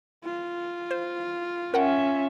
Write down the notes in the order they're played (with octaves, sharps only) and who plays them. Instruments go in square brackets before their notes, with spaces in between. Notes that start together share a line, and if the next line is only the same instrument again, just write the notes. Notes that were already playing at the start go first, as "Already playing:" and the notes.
[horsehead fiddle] F4
[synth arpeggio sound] C5
[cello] C#4 E5 [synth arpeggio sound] A#4 F#5 G5